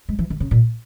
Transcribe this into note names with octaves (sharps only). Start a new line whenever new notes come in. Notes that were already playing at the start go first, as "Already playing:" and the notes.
G#3
E3
D#3
C#3
A#2